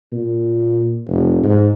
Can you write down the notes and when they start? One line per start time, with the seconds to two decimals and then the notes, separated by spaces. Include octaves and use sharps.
0.13 A#2
1.08 F1
1.43 G#2